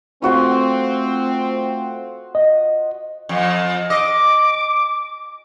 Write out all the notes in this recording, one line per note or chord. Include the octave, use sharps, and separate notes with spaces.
A3 C4 F4 F#4 C5
D#5
F2
D#5 D6